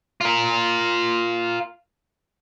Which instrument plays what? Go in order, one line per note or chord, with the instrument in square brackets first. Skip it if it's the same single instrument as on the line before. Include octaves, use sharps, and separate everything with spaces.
[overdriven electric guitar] F4 A#4